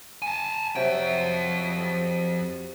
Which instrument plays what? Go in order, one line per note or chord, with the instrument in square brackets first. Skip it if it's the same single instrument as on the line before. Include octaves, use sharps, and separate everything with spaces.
[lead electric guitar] G#5 A5
[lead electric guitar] F2 G5 [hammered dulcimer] C3 F#3